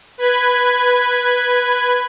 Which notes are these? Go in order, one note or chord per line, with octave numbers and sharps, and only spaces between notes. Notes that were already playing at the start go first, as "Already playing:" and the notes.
B4 B5 G#6